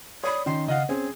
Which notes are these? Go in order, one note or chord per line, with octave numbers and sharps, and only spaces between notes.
C#5 D5 B5 D#6
D#3 C#4 C6
C#3 D#5 F5 F#5
C4 C#4 G#4